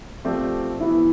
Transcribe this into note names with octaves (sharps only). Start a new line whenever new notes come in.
F3 A3 C4 G4 D5
E3 B3 E4